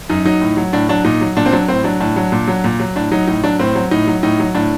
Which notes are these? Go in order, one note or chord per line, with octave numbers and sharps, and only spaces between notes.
F#2 D#4
F#3 D#4
A2
F#3
A2 D4
F#3 D4
A#2 D#4
F#3
A#2 D4
C4
F#3 D4
A2 C4
F#3 D4
A2 D4
F#3
A#2
F#3
A#2
F#3
A2 D4
F#3 D#4
A2 D#4
F#3 D4
A2 C4
F#3
A2 D#4
F#3
A2 D#4
F#3
A2 D4